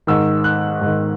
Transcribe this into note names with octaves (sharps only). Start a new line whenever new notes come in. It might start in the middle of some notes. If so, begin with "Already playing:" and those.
G#2 D#3 E6
F#6
G#2 D#3